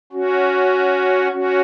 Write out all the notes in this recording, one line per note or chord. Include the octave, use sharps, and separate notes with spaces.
C#4 F#4
C#4 F#4